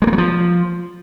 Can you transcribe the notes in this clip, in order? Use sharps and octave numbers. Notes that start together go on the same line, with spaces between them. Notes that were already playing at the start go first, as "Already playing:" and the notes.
G#3
A#3
F#3
F3